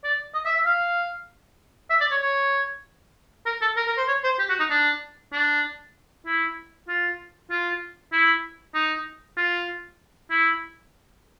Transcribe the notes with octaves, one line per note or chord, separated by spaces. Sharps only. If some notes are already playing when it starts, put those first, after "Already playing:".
D5
D#5
E5
E5
F5
E5
D5
C#5
C#5
A#4
A4
A#4
A#4
C5
C#5
C5
G4
F#4
D#4
D4
D4
E4
F4
F4
E4
D#4
F4
E4